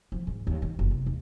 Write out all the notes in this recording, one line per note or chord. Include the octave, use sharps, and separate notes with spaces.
F3
G#2
D#2
D#3
F#1
C3
D#2